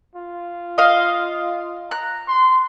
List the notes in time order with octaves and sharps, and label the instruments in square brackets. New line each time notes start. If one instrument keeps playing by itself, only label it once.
[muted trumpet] F4
[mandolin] D#5 F5
[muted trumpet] A#5 [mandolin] F#6
[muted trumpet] C6